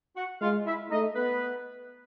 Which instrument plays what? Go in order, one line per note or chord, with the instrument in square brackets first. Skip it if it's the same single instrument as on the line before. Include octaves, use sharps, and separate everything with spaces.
[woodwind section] F#4 F#5
[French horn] G#3 [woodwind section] F4 F5
[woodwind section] E4 E5
[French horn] A3 [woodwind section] D#4 D#5
[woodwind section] B3 B4